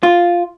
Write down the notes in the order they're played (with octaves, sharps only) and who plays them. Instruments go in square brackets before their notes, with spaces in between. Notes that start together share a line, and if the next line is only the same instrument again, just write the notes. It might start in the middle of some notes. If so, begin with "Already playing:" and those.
[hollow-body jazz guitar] F4